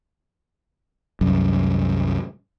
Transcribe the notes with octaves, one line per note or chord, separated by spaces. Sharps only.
C2 F#2